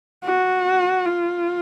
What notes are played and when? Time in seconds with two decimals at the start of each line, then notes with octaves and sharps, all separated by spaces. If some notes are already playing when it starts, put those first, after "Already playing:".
0.24 F#4
1.06 F4